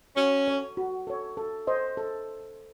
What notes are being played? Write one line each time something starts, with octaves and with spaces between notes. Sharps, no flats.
C#4 F#4
A4 C#5
F#4
A4 C#5
A4
C5 D#5
A4